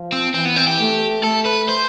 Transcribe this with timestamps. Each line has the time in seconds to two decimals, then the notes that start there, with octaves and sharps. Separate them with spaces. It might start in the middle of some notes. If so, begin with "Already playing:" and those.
Already playing: F3
0.12 C4
0.34 E3 C4
0.45 B3
0.57 C4
0.68 G4
0.80 A3
1.23 A3 A4
1.45 B4
1.68 C5